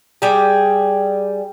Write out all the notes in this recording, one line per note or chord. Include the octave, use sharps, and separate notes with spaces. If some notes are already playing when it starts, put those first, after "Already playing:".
G3 G#4